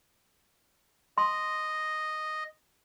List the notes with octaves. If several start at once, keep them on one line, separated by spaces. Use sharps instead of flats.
D#5 C6